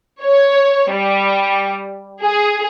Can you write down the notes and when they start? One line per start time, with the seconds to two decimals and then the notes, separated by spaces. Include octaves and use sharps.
0.23 C#5
0.93 G3
2.22 G#4